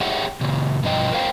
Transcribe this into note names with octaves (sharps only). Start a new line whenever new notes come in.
G4 G#4 C#5 E5 F#5 G5
A#2 C#3
G2 B2 F3 D#5 G5
A#4 C5 F5 G5